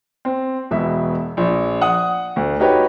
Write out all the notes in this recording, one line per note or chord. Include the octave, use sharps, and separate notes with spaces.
C4
E1 B2 E5
A#1
F#5 D#6
D2
D#4 F#4 G4 B4 C#5